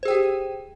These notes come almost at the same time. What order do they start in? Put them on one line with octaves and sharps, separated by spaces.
C5 G#4 G5 G4